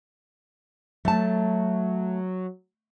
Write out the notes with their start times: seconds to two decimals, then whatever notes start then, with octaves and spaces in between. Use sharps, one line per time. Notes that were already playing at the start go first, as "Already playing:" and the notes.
1.05 F#3 A3 A5